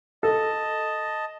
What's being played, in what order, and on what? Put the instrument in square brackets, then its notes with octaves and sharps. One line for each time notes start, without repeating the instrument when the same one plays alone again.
[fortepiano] A4 [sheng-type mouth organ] D#5 A5